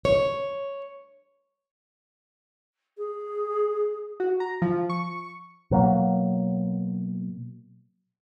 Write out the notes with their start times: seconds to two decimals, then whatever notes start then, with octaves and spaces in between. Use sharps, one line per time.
0.05 C#5
2.97 G#4
4.20 F#4
4.40 A#5
4.62 F3
4.89 C#6
5.71 B2 F#3 A#3